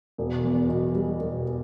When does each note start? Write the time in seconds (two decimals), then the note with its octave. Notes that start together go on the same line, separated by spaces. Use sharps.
0.18 E1
0.44 E2
0.69 B2
0.95 G3
1.20 E1